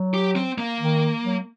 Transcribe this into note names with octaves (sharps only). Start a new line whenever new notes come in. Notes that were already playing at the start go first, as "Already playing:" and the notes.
Already playing: F#3
G4
C4
A#3
D#3
F#3